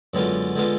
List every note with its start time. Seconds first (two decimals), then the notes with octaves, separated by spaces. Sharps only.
0.14 F#2 D3 G#3 B3 F4
0.56 D3 G#3 B3 F4